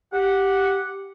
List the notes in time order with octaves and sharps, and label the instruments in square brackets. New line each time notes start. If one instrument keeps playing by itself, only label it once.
[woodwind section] G4 F#5